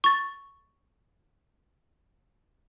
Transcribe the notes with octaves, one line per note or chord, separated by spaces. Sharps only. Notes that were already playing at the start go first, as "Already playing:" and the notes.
C#6 A6